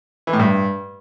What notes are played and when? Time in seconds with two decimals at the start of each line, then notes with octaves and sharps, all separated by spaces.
0.27 E3
0.33 A2
0.39 G2